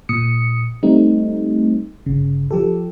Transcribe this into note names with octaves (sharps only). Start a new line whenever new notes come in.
A#2 D#6 C#7
G3 A3 C4 D#4
G1 C#3
F3 G4 A4